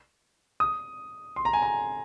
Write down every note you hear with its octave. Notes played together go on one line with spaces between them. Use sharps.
D#6
C6
A#5
G#5
A#5